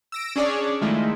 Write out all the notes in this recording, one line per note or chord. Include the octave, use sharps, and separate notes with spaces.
E6 A#6 D7
C#4 D4 G#4 C#5 D5
D#3 F3 G#3 A3 D#4 E4